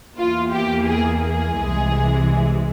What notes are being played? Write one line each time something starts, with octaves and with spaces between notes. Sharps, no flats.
E2 E3 A#3 F4
G4
G#4
G#4
C2 C3 E3 G#3